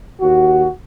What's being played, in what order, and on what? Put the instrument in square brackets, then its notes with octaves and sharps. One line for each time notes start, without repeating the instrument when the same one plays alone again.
[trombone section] D#2 F#4